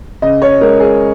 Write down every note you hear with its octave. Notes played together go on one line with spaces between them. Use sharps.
C#3 D#5
C#5
G#3 A#4
G#4